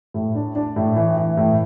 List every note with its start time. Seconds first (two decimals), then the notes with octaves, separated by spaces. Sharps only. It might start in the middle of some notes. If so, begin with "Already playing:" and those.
0.14 A2
0.35 D4
0.56 D4
0.76 A2
0.96 E3
1.17 E3
1.37 A2